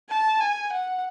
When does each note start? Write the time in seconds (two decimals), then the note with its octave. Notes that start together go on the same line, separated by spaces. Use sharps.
0.09 A5
0.41 G#5
0.72 F#5